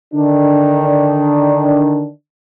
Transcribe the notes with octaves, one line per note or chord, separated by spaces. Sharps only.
D3 D#3 D4